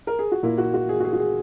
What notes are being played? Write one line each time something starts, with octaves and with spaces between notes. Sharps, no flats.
A#4
G#4
F#4
A#2 A#3 E4
F#4
F#4
G#4
F#4
G#4
F#4
G#4